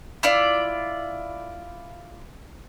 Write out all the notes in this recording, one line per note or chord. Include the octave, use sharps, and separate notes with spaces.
E4 F4 D5